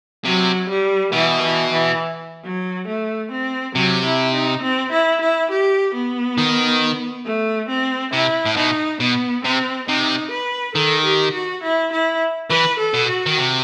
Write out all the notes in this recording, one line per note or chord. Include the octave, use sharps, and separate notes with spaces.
C3 F#3
G3
B2 E3
E3
E3
F#3
A3
C4
C3 F#3
E4
D#4
C4
E4
E4
G4
B3
D#3
A3
C4
C3 E4
A2
B2 D#4
B2 B3
C3 C4
C3 D#4
B4
D#3 A4
G4
F#4
E4
E4
E3 B4
A4
B2
F#4
D#3
C3